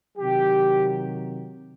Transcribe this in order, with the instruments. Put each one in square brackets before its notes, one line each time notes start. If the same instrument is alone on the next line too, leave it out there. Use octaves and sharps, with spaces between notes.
[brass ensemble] C3 D#3 F#3 G4